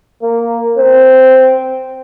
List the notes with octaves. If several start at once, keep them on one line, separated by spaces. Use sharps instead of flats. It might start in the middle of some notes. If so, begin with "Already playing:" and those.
A#3
C4